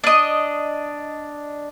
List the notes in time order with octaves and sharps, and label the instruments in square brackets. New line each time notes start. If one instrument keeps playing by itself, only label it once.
[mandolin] D4 D#5